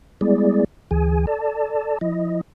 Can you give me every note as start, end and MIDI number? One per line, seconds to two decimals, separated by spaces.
0.21 0.64 55
0.21 0.64 56
0.21 0.64 59
0.21 0.64 64
0.21 0.64 68
0.21 0.64 74
0.91 1.26 38
0.91 1.26 52
0.91 1.26 68
0.91 1.26 80
1.27 1.98 69
1.27 1.98 74
1.27 1.98 81
2.01 2.41 53
2.01 2.41 64
2.01 2.41 75